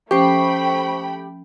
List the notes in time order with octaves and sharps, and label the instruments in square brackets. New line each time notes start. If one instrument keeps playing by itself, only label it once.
[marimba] F3 C#4 [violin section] A3 G5 B5 [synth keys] G4 [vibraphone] C5 C#6